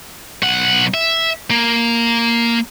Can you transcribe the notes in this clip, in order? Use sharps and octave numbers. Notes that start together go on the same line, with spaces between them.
B1 F#5
E5
A#3